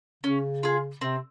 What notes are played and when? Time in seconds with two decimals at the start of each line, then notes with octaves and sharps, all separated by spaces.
0.24 C#3 C#4
0.63 F4 G#4
1.01 C3 C4